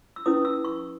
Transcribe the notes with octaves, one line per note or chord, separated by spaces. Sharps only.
E6
C#4 E4 B4 D#6
E6
C#6